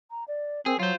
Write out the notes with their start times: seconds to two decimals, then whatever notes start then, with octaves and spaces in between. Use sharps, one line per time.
0.11 A#5
0.28 D5
0.66 C4 G#4 A#4
0.79 F#3 F4 F#4 C5